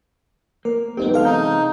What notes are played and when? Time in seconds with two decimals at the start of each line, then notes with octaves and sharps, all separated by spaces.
0.65 A#3 A#4
0.97 F#2 G#3 B3 C4 D#4 G4
1.14 C3 E3 G#3 A4 F5 F6
1.25 D#4 G6